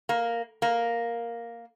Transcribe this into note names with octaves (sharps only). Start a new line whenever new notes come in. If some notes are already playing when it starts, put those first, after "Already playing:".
A#3
A#3